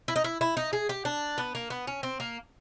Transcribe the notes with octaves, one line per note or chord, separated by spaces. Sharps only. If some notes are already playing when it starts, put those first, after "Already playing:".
E4
D#4
E4
E4
D#4
G#4
G4
D4
B3
A#3
B3
C#4
C4
A#3